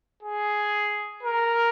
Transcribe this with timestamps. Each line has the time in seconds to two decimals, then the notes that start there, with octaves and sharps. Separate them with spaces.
0.23 G#4
1.23 A#4